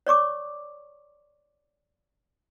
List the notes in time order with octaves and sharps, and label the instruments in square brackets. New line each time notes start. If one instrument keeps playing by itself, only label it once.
[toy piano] C#5 D5 C#6 D6